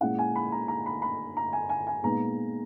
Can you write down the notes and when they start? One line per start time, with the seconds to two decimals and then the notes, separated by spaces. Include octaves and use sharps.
0.01 A#2 G#3 C#4 E4 F#5
0.19 G#5
0.36 B5
0.52 A#5
0.68 A#5
0.86 B5
1.02 B5
1.37 A#5
1.53 G#5
1.69 G#5
1.87 G#5
2.03 A#2 G#3 B3 D#4 A#5